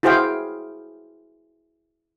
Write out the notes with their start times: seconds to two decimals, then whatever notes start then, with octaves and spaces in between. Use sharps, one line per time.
0.03 E4 F#4 G#4 C5 F5 G5